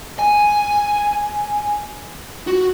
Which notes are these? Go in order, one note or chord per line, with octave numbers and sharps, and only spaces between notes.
G#5
F#4